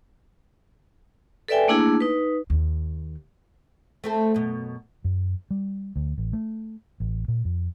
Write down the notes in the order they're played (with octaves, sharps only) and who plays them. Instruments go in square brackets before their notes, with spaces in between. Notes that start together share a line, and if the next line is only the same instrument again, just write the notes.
[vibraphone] A4 B4 D5 E5 G5 G#5
A3 A#3 D4 E4 G#4
D#4 B4
[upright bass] D#2
[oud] A3 C4 A4
F#2 B2
[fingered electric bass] F#2
G3
D2
A1
A3
A1
A#2
F2